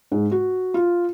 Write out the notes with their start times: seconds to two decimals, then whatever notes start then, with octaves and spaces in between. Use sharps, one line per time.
0.11 G#2
0.31 F#4
0.74 F4